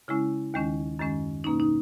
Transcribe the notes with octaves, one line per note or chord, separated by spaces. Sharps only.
C#3 G#3 C#4 E4
D#2 D#3 G#3 C#4
F#2 D#3 G#3 C#4
B2 A#3 C#4 D#4
D#4